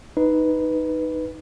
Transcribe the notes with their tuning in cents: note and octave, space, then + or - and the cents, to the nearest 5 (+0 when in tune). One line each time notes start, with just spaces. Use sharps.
D#4 +0 B4 +0